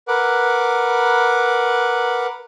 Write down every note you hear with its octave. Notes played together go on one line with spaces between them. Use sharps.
A#4 B4 F#5 D6